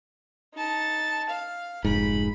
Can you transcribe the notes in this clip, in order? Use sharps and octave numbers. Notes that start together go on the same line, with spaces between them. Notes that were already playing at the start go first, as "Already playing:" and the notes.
D#4 A5
F5
F1 G#2 B5